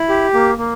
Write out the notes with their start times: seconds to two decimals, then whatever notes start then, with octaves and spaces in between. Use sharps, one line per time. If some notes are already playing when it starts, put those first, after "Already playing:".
Already playing: E4
0.09 G4
0.34 A#3
0.58 A#3